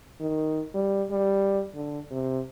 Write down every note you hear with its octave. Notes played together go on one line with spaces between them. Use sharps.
D#3
G3
G3
D3
C3